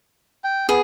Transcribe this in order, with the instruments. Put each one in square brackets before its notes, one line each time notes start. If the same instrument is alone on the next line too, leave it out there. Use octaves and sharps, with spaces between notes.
[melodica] G5
[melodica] B3 [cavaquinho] G#4